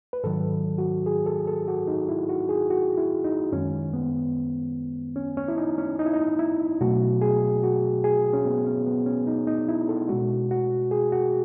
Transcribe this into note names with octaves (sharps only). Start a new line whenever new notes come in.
B4
G#2 D#3 F#3 A4
F#4
G#4
A4
A4
F#4
D#4
E4
F#4
G#4
F#4
E4
D#4
F#2 D#3 G#3 C#4
B3
C#4
C#4
E4
D#4
C#4
D#4
E4
D#4
E4
B2 F#3 A3 F#4
G#4
F#4
G#4
C#4
B3
C#4
B3
C#4
D#4
D#4
E4
A4
B2 G#3 F#4
F#4
G#4
F#4